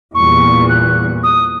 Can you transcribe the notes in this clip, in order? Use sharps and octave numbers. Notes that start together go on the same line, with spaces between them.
E2 A#2 G3 C#6
F#6
D#6